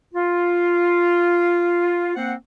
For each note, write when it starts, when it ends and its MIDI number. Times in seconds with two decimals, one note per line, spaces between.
0.14 2.14 65
2.16 2.34 58
2.16 2.34 60
2.16 2.34 72
2.16 2.34 78